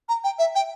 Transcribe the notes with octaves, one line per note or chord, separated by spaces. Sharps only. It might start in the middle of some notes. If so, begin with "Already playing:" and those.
A#5
G5
E5
G5